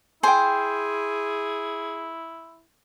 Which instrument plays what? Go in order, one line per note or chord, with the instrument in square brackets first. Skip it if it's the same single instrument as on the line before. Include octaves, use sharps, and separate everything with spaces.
[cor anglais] E4 [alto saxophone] G#4 [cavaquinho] C5 [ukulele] G5 G#5